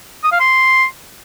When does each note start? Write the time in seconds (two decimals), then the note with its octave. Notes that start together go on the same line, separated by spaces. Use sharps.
0.24 D#6
0.32 F5
0.40 C6